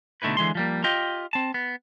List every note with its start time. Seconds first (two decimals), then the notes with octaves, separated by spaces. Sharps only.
0.22 B2 D3 A3 D#4 E4 B4
0.37 D3 E3 G#3 C6
0.55 F3 G3 A#3
0.84 F4 G4 D#5 G5
1.33 C4 A5
1.54 B3